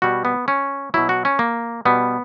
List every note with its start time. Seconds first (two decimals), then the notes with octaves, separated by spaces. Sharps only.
0.02 B2 G3 F#4
0.25 B3
0.48 C#4
0.94 B2 F#3 E4
1.09 F#4
1.25 C#4
1.39 A#3
1.85 B2 G3 B3